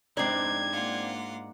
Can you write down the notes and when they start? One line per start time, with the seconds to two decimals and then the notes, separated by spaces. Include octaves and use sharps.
0.17 G#2 C4 D4 D#4 D5 G#6
0.71 A#3 F4 F#5